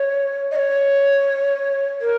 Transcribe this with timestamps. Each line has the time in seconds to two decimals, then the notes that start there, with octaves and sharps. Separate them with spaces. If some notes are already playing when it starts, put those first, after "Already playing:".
Already playing: C#5
0.51 D#5
0.56 C#5
2.01 A#4